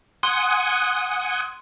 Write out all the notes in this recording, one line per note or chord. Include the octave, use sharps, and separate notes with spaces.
F#5 G#5 C6 D#6